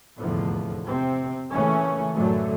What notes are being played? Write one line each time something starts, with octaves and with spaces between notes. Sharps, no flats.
F1 E2 A2 D3 F3
C3 C4
A#2 C#3 E3 A3 C#4
A1 F#2 D3 F#3 A3